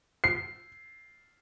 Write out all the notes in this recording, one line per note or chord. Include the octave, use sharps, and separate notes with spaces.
C7